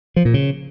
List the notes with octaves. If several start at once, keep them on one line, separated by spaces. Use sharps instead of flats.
F3
A#2
C#3